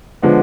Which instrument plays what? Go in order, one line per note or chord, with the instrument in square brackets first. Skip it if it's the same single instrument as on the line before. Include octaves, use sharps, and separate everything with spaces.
[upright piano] D3 F3 G#3 B3